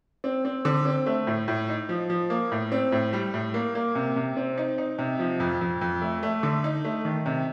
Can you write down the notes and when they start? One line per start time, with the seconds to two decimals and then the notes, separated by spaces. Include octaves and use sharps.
0.24 C4
0.45 C4
0.65 D3
0.86 C4
1.06 A3
1.27 A2
1.48 A2
1.68 D#4
1.89 F3
2.10 F3
2.30 A#3
2.52 A2
2.72 C4
2.92 A2
3.13 G3
3.34 A2
3.54 A#3
3.75 A#3
3.95 C3
4.16 C3
4.37 C4
4.58 D#4
4.78 D#4
4.98 C3
5.19 F3
5.40 F2
5.61 F2
5.81 F2
6.02 A3
6.23 A3
6.43 D3
6.64 D#4
6.84 A3
7.05 D#3
7.26 C3